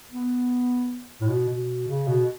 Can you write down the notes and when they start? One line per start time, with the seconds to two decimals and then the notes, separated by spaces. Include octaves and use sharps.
0.11 B3
1.21 A2
1.29 B2
1.49 B2
1.88 C#3
2.07 B2